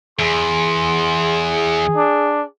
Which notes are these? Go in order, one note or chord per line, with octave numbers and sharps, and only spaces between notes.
E2 G#4 C6
D4